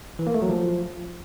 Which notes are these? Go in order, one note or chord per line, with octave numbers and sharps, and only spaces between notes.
E3
A#3
A3
F#3
F3